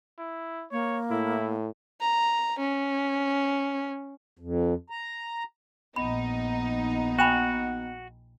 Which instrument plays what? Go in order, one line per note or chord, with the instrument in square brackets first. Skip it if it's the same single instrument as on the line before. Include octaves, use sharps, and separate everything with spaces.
[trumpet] E4
[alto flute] A#3 [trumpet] C#5
[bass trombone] A2 [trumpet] E4
[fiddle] A#5
C#4
[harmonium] F2
A#5
[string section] A#1 D#4 [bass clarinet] B3 [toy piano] B5
[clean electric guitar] F#4 [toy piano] G5 G#5 B5